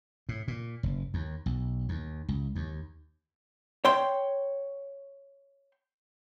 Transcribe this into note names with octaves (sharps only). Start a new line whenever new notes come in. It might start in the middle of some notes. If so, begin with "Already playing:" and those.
A2
A#2
F#1
D#2
B1
D#2
C#2
D#2
C#5 G5 C6